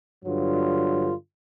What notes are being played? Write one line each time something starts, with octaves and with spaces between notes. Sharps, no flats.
G2 D3 F#3 F4